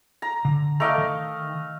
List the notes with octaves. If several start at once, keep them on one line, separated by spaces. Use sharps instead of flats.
A#5
D3
A3 D5 D#5 F5 G5 A#5
D#3